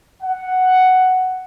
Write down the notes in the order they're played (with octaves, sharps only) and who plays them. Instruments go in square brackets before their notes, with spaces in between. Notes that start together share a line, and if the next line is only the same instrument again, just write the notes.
[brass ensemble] F#5